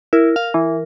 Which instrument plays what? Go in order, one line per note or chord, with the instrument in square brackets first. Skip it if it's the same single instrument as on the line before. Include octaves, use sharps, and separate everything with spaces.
[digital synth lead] E4 [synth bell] A#4
[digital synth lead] F5
E3